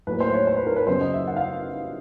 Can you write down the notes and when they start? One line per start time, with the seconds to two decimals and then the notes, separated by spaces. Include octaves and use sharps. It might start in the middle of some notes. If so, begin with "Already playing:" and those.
0.07 A2 F#3 A#3 B4
0.20 C5
0.33 C#5
0.47 C5
0.57 B4
0.67 A#4
0.76 B4
0.86 F#2 C#3 F#3 B3 C5
1.01 D#5
1.13 E5
1.27 F#5
1.36 F5